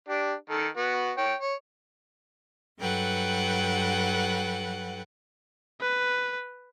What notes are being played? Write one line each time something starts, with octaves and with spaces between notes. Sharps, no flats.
D4 G4
D#3 A4
B3 F#4
C#5 G5
C#5
G2 F#3 A4 B4 F#5 G5
B4